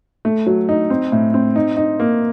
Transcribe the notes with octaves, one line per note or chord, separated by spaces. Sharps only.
A3
F#3
D#4
C4
A2
C4
D#4
D#4
A#3